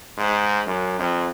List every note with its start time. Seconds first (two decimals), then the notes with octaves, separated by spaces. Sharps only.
0.18 G#2
0.66 F#2
0.99 F2